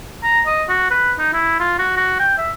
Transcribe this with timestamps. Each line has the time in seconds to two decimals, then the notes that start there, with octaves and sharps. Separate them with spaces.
0.23 A#5
0.46 D#5
0.69 F#4
0.91 B4
1.19 D#4
1.33 E4
1.60 F4
1.79 F#4
1.97 F#4
2.19 G5
2.38 E5